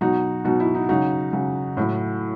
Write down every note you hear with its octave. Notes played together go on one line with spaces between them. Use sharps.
B2 F#3 D#4 F#4
B2 F#3 D#4 F#4
E4
D#4
C#3 F#3 D#4 F#4
C#3 F#3
A2 F#3 E4